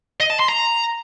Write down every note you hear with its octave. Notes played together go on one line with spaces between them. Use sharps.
D#5
A5
C6
A#5